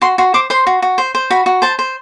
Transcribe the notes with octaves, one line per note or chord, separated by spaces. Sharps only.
F#4 C6
F#4 C6
C5 D6
C5 C6
F#4
F#4
C5
C5
F#4 B5
F#4
C5 A5
C5